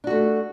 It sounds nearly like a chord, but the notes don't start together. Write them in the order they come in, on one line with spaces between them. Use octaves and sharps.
D4 F#4 A3